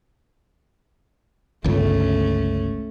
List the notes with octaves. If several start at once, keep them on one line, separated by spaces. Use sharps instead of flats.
G1 C#2 A3 C#4